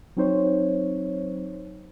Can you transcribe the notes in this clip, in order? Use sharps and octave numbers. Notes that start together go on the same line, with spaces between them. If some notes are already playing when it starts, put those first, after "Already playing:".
F#3 C4 D#4 C5 C#5